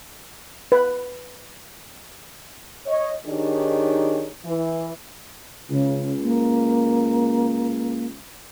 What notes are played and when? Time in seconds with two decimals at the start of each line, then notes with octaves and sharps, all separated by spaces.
0.72 B4
2.87 C#5 D#5
3.26 D#3 D4 D#4 G4 G#4 C#5
4.45 E3
5.70 C#2 C#3
6.23 A#3